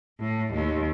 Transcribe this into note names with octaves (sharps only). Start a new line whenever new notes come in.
A2
D#2